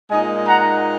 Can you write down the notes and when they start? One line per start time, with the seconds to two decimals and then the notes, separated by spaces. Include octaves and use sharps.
0.10 A#2 G#3 D#4 D#5 G#5
0.47 F#5 A#5